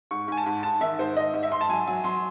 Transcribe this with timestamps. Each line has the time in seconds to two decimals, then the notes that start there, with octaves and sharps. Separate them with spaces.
0.11 G#2 C#6
0.28 G#2 G#5
0.37 A5
0.46 G#2
0.63 G#2 A5
0.81 D#3 E5
0.99 G#2 C5
1.17 G#2 D#5
1.33 G#2
1.43 E5
1.52 G#2 C6
1.61 A5
1.69 F#3 G#5
1.87 F#3 G#5
2.04 F#3 C6